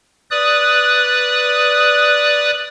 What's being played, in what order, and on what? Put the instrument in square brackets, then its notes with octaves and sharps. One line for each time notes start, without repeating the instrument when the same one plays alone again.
[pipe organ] B4 D5 D#6 F#6